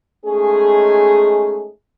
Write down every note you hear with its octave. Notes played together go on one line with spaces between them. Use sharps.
G#3 A3 C#4 D#4 G#4